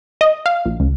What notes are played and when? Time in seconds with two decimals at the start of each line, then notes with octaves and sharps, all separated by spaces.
0.21 D#5
0.46 F5
0.65 A#1
0.80 C#2